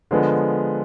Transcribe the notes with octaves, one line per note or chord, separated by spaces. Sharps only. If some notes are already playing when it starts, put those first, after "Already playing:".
D3 F3 G#3 B3